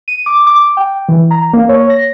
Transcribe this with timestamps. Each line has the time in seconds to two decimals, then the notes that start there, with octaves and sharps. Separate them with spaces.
0.08 D#7
0.26 D6
0.47 D6
0.77 G5
1.09 E3
1.31 A#5
1.53 A#3
1.69 C#5
1.90 A#6